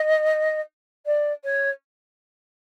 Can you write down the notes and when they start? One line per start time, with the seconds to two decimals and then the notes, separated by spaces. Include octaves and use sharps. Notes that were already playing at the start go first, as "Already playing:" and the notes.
Already playing: D#5
1.06 D5
1.44 C#5